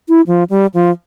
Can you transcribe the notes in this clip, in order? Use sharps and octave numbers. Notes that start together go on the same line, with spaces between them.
E4
F3
G3
F3